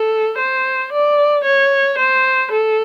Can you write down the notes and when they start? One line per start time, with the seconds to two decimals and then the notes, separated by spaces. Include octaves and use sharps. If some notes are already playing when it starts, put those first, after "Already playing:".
Already playing: A4
0.38 C5
0.92 D5
1.45 C#5
1.98 C5
2.52 A4